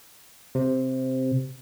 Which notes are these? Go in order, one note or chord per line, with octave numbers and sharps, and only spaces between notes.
C3